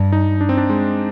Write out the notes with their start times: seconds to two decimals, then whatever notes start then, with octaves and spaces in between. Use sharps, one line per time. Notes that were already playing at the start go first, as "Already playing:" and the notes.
Already playing: G2
0.12 D#4
0.41 D4
0.49 C4
0.57 D4
0.70 G#3